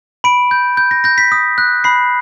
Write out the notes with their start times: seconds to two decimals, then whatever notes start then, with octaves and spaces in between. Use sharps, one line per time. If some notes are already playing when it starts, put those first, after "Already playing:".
0.24 B5 D7
0.51 G6
0.77 G6
0.91 A#6
1.04 G6 A#6
1.18 B6
1.32 D#6
1.58 F#6
1.84 B5 C7